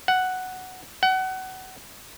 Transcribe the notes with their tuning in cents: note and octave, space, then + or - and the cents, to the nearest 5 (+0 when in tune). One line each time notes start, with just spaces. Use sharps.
F#5 +5
F#5 +30